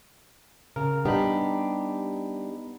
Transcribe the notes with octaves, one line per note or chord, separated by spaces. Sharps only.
C#3 A#4
G3 B3 D4 D#4 G4 B5